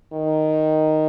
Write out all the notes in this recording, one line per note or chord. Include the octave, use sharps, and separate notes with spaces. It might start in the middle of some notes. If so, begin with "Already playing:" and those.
D#3